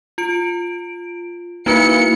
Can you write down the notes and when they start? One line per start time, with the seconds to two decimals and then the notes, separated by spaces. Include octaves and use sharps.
0.18 F4 D7
1.66 A#3 D#4 E4 F#4 B4 C#7